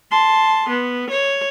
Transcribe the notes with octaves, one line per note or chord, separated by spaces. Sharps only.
A5 C6
B3
C#5